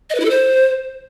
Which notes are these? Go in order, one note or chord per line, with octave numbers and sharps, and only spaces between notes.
D#5
B4
E4
A4
C5